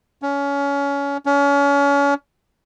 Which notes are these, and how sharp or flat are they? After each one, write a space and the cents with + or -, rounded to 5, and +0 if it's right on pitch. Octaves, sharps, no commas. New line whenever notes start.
C#4 +25
C#4 +35